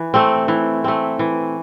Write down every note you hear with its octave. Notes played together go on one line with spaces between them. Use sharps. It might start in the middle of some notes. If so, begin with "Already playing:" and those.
Already playing: E3
A3 C4
E3
A3 C4
E3